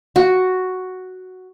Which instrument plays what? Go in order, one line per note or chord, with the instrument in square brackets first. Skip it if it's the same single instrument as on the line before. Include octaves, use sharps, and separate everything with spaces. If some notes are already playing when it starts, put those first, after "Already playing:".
[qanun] F#4